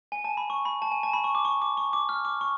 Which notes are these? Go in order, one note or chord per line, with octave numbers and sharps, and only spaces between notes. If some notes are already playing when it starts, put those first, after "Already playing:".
G#5
A5
B5
C#6
B5
A5
G#5
A5
B5
C#6
D6
C#6
D6
C#6
D6
F6
D6
C#6